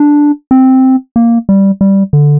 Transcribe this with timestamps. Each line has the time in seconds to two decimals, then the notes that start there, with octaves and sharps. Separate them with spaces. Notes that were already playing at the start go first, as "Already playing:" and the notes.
Already playing: D4
0.51 C4
1.16 A#3
1.49 G3
1.81 G3
2.13 D3